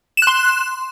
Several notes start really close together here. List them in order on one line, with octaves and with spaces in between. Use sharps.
E7 F#6 C6